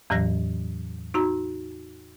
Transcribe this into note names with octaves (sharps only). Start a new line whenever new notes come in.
E2 A2 E3 F#3 A#6
D#4 F#4 A#5